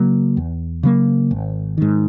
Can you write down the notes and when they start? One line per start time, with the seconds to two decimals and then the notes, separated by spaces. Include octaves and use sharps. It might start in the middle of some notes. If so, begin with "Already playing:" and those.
Already playing: C#3 F#3 A#3
0.37 E2
0.83 C#3 F#3 A#3
1.31 G#1
1.78 G#2 D#3